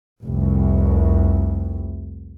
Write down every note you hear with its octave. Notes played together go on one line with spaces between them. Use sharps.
F1 C2